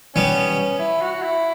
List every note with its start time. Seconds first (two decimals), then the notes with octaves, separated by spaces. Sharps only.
0.15 G3 B3 C#4
0.47 C#4
0.79 E4
1.01 F#4
1.22 E4